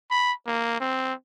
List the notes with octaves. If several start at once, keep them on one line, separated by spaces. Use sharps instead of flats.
B5
A#3
C4